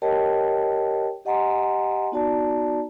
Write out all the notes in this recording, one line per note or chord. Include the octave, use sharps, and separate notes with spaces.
G4 A#4 C#5 D#5 G5 A5
G4 D#5 F#5 G#5 A#5 C6
B3 D#4 F#4 D5 A5 A#5